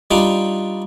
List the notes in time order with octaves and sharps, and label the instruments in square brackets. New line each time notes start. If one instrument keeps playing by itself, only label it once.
[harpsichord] G3 D4 D#4 F4